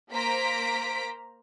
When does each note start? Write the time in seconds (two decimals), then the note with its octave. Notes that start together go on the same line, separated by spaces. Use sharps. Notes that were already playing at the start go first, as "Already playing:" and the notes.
0.12 A#3 C5 A#5 B6 D7